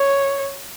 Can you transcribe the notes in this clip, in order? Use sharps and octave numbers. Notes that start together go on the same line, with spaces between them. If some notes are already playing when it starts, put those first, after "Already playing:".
Already playing: C#5